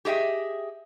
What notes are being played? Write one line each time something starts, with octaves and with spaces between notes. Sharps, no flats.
G4 G#4 D#5 E5 G5